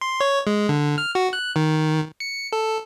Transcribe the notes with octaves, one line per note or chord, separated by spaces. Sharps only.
C6
C#5
G#3
D3
F6
F#4
F#6
D#3
C#7
A4